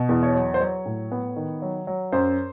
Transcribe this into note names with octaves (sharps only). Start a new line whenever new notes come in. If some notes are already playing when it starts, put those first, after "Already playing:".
Already playing: B2
E2
C#5
F#3
C5
F#3 C#5
A2
B3
D#3
F#3
F#3
F#2 C5